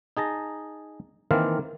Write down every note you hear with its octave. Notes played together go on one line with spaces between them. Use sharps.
D#4 G#4 A5 A#5
D#3 E3 A#3 C4 F5 A5